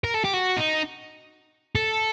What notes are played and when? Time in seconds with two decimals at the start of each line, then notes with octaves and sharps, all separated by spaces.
0.04 A#4
0.14 A4
0.24 G4
0.34 F#4
0.57 D#4
1.75 A4